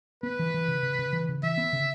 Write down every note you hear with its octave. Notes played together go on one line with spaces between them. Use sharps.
B3 B4
E3
E3
C#3
C#3
C#3
E3
C#3
E3 E5
B3
C#3